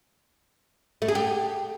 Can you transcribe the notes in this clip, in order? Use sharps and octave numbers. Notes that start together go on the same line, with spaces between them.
A3
G#4
G4